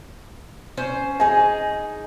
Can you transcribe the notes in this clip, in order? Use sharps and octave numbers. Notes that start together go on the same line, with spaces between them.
C#4 C5
D#4 G#4 G#5